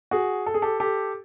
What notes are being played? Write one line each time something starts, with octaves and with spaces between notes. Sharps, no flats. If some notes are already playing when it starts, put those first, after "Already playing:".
F#4 G#4
A4
G#4
G4 A4
G4 A4